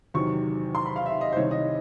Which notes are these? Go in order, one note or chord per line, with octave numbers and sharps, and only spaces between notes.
E2 C3 D#3 F#3 C#6
C6
B5
F5
E5
D#5
C5
C2 C3 D#3 C#5
D#5